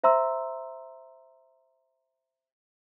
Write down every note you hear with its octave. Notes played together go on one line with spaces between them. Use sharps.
C5 E5 A#5 C6 E6